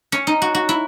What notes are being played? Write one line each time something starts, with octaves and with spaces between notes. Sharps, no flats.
C#4
D#4
F#4
F#4
E4